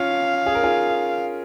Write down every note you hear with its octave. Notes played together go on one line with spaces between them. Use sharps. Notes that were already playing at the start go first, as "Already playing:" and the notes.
Already playing: C#4 F4 F5
G#4
A#4
F4 G#4